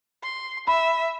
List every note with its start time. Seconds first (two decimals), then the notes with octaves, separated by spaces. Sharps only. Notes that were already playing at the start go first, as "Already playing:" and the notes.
0.23 C6
0.67 E5 B5